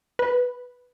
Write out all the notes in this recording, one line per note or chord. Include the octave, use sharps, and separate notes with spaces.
B4